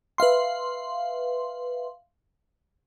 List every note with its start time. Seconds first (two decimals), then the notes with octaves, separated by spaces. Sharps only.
0.18 B4 E5 F5 C6